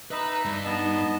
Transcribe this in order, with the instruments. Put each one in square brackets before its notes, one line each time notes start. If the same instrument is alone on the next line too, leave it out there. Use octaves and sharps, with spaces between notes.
[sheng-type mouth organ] D#4 D#5 E5 [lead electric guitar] B4 B5 [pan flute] A#5
[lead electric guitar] G2
[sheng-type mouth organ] B3 D#5 A5 [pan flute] D#4